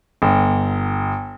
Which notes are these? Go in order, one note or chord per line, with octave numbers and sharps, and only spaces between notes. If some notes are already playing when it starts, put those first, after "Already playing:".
G1